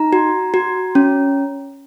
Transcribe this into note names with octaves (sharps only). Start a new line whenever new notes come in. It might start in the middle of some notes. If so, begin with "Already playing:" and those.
Already playing: D#4 A#5
F#4
F#4
C#4